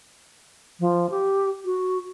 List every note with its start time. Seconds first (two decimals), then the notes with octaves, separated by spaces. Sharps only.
0.80 F3
1.10 G4
1.65 F#4